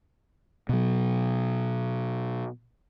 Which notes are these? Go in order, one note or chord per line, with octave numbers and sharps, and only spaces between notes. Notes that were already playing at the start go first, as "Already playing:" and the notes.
B2 F#3